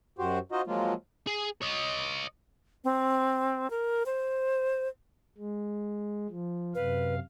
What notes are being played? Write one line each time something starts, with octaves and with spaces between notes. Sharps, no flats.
F#2 F#4 G4 C5
D#4 F4 F#4 C5 D#5
F3 F#3 G#3 A#3 F4
G#4
C#5 D#5
C4
A#4
C5
G#3
F3
F#2 C3 B4 F5